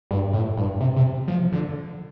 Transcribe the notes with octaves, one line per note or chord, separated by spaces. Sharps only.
G2
A2
G2
C3
C3
F3
D3